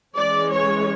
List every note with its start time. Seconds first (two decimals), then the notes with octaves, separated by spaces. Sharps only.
0.15 E3 G#3 C#4 D5
0.51 C#5